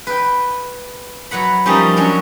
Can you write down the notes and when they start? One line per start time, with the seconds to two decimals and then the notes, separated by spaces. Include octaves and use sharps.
0.07 B4 G5
1.31 F#3 B4 F#5 B5
1.66 F3 G3 A#3 C#4 D#4 G4
1.97 F#3 C#4 D4